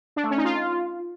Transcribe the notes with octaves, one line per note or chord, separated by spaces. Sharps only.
D4
A3
C#4
D#4
F4